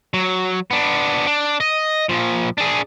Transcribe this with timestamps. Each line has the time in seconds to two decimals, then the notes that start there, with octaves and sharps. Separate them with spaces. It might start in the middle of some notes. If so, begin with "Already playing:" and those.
0.14 F#3
0.71 B3 D4
1.27 D4
1.60 D#5
2.09 A#2 F3
2.58 D4 G#4